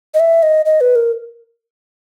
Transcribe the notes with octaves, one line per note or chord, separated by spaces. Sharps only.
D#5
E5
D#5
D#5
B4
A#4